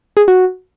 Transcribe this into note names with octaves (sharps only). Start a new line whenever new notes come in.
G#4
F#4